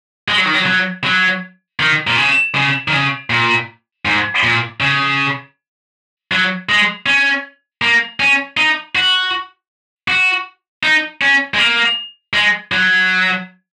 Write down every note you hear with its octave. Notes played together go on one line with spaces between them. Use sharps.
G#3
F#3
D#3
F#3
F#3
F#3
D#3
A#2
C#3
C#3
D#3
C#3
A#2
G#2
A#2
C#3
F#3
G#3
C#4
A#3
C#4
D#4
F#4
F#4
D#4
C#4
G#3
A#3
G#3
F#3